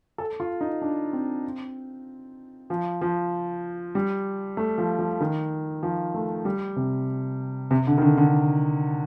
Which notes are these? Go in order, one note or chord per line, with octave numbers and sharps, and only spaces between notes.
A4
F4
D#4
D4
C4
F3
F3
G3
A3
F3
F3
D#3
F3
A3
G3
C3
C3
D3
D#3
D3
D3